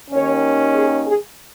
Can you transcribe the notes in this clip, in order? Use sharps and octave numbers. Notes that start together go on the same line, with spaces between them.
D#2 D#3 C#4 C#5
G#4
G#4